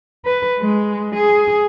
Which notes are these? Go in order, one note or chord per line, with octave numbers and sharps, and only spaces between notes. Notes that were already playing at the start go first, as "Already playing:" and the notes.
B4
G#3
G#4